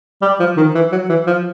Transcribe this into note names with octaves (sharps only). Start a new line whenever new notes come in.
G3
F3
D#3
E3
F#3
E3
F3